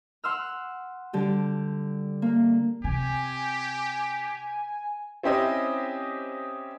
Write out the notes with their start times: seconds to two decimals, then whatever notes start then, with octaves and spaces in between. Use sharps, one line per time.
0.24 F#5 C6 E6 F6
1.13 D3 G3 G4
2.22 A#3
2.84 C3 G4 G#5
5.23 C4 C#4 E4 G4 C5 D#5